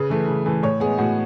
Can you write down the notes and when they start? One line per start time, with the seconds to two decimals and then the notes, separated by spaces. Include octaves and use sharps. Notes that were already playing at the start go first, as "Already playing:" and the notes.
Already playing: C#3 B4
0.10 E3 A3
0.28 C#3
0.46 E3 A3
0.63 A2 C#5
0.80 G#3 B3 G#4
0.98 A2 F#4